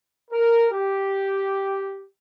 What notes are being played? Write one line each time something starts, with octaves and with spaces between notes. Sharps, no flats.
A#4
G4